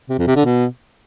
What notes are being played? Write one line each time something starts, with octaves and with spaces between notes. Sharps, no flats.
C3
F2
C3
D3
B2